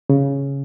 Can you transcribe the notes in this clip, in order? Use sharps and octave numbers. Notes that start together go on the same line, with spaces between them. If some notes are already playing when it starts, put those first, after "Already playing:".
C#3